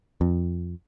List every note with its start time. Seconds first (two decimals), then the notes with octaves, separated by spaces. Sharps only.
0.21 F2